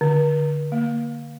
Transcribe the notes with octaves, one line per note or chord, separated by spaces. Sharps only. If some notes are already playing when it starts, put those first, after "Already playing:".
D3
A#3